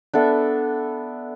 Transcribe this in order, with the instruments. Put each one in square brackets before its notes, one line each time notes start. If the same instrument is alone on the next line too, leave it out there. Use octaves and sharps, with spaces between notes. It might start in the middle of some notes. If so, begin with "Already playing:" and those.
[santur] B3 D4 A4 E5